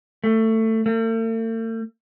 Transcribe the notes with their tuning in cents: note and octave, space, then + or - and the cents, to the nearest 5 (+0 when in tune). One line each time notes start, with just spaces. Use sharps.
A3 +20
A3 +45